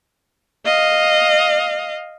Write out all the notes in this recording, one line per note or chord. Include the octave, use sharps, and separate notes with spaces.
D#5 F5